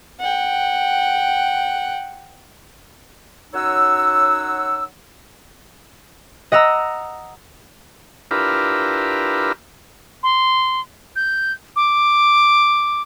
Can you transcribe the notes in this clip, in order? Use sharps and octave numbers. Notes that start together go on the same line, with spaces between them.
F#5 G5
F#2 F#3 D#4 C#5 F#5 E6
D#5 F#5 A#5 E6
D4 E4 F4 G4 A#4 B4
C6
G6
D6